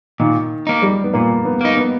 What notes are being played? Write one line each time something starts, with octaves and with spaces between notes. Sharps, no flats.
A#2 D#3
A#3 D#4
G3
B3
A#2 A#3
B3
A#3 D#4
B3